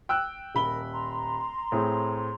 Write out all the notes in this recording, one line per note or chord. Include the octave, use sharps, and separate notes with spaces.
G5 E6 F#6
D#1 A#4 B5 G7
A#5 C6
A2 C4 G#4